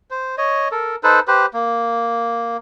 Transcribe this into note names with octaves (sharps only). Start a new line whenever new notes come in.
C5
C#5 D#5
A4 A#4
D#4 A4 B4 C5
G4 B4 C5
A#3